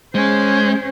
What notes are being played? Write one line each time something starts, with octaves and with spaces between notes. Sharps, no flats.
G#3 C#4 C5